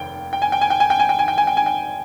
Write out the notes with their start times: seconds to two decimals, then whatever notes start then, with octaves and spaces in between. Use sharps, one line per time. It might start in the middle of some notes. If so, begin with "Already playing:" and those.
Already playing: F1 D#2 G5
0.33 G5
0.42 G#5
0.52 G5
0.61 G#5
0.70 G5
0.80 G#5
0.90 G5
0.99 G#5
1.09 G5
1.19 G#5
1.28 G5
1.38 G#5
1.47 G5
1.57 G#5
1.66 G5